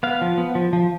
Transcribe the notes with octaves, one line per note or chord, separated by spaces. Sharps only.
B3 F5
F3
B3
F3
F3